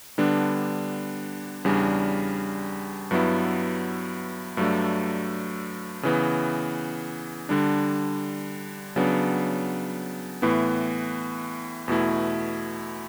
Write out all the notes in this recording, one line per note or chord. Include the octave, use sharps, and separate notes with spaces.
D3 G3 B3 D4
E2 C#3 G3 D4
G2 F#3 B3 E4
G2 F#3 A3 D4
C#3 E3 B3
D3 G3 D4
C#3 F#3 B3 D4
A2 E3 B3
E2 B2 A3 E4